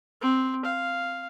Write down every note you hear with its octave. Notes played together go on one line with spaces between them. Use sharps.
C4
F5